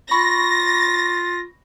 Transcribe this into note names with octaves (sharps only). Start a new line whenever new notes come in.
F4 B5 C#6 A#6